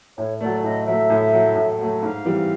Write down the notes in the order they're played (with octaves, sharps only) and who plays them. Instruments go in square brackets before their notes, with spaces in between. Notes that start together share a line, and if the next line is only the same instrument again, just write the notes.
[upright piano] A2 [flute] C#5
[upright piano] F#3 A3 [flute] D5
[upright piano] A2 [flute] D#5
[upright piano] F#3 A3 [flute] E5
[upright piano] A2
F#3 A3
A2
F#3 A3
[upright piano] G#2 [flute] F5
[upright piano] E3 G3 C4